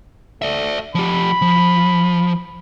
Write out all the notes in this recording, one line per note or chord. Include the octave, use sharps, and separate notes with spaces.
A3 D5 E5
F3 G4 B5
F3